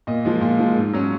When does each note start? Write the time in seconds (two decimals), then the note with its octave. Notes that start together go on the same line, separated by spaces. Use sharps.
0.07 A#2 D#5
0.25 F3 G#3
0.41 A#2
0.59 F3 G#3
0.76 G#2
0.93 F#3 C#4